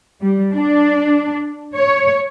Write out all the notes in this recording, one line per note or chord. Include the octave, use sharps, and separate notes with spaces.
G3
D4
C#5